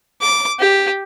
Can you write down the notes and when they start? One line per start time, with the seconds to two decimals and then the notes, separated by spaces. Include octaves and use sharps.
0.21 D6
0.60 G4